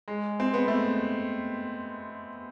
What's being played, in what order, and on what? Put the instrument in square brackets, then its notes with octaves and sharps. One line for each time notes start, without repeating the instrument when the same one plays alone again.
[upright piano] G#3
C4
B3
A3